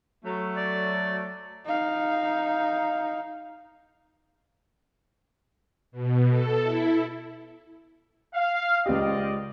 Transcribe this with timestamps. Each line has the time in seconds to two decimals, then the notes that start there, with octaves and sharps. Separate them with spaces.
0.24 F#3 A3
0.56 D5
1.65 D#4 F5
5.92 B2
6.29 A4
6.61 E4
8.35 F5
8.86 C#2 C4 G4 D5 D#5